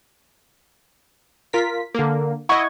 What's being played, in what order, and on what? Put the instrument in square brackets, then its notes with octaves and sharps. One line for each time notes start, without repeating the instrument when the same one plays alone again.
[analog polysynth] F4 A#4 B6
D3 A#3
[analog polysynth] E4 D#5 [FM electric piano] F#5 C#6 G#6